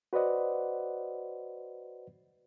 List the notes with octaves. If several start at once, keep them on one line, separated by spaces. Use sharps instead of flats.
F#4 B4 C5 D5 D#5 F#5